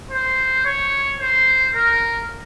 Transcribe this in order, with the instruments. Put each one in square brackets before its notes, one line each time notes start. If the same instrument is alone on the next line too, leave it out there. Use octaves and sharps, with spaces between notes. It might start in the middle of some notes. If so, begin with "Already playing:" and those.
[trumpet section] C5
C#5
C5
A#4